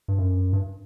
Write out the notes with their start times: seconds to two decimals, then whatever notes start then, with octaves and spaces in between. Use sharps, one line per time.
0.08 G2
0.19 F#2
0.53 G2